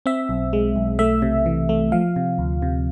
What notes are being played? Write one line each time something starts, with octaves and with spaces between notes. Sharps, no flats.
C4 E5
B1
G#3
B1
A3 E5
C3
E3
A3
F3 F5
C3
D2
C3